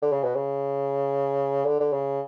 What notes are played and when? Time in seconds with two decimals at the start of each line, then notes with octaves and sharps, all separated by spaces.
0.02 D3
0.12 C#3
0.24 B2
0.35 C#3
1.65 D3
1.80 D3
1.92 C#3